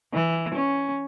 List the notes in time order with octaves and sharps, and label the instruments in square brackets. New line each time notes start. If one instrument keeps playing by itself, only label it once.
[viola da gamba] E3
C#4